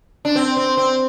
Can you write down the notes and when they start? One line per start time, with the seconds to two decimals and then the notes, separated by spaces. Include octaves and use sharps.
0.25 D4
0.36 C4
0.57 C4
0.77 C4